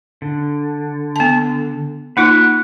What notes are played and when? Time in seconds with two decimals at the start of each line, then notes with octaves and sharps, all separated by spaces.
0.22 D3
1.16 B3 A5
2.17 A#3 D#4 F4 B5 F#6